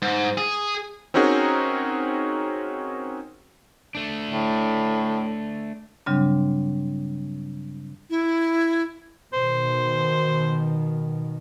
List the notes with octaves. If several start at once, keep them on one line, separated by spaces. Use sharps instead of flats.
G#2
G#4
C4 C#4 D#4 F#4 G#4 A#4
A3 D4
A2
G2 C#3 F#3 G3 C4 D4
E4
B2 D#3 C5